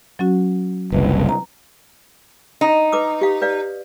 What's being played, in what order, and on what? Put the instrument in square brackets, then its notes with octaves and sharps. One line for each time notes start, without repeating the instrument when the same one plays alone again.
[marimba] F#3 C#4 F#4
[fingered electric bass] F#1 C2 [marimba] B4
[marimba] A#5
[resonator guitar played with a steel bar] D#4
[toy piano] B4 D6 D#6
G4 F5
B4 D5 F5